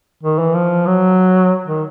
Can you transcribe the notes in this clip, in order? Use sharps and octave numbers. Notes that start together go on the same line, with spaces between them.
D#3
E3
F3
F#3
D#3